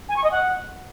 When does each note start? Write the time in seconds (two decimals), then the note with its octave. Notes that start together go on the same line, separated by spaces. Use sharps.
0.08 G#5
0.16 C#6
0.23 D#5
0.31 F#5